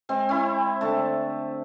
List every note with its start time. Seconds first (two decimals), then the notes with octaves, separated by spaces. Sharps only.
0.09 G#3 C4
0.29 C4 E4
0.81 D3 A3 A5